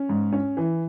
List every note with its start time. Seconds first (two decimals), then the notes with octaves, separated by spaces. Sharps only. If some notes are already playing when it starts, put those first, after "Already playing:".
Already playing: C#4
0.09 G#2
0.32 C#4
0.57 E3